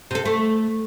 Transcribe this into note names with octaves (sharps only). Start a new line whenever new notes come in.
C3 A4
A3